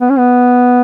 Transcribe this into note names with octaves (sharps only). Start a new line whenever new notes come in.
B3
C#4
B3